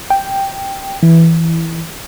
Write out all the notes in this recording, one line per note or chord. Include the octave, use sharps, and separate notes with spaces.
G5
E3